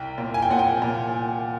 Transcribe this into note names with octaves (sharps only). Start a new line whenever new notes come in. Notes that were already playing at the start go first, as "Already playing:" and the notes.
Already playing: C2 G5
A#2
G#5
G5
A#2 F#5
G5
A#2